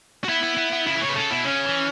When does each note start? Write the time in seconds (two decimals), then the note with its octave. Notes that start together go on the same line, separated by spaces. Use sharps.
0.24 F#4
0.29 B3 E4
0.43 B3
0.57 B3
0.72 B3
0.86 C#3 E4
0.95 E3
1.01 C#3 C#5
1.09 B4
1.16 C#3 A4
1.31 B2 E4
1.45 C#3 C#4
1.65 E3